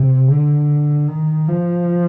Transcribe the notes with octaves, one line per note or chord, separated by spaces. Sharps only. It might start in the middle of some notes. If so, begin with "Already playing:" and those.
Already playing: C3
D3
D#3
F3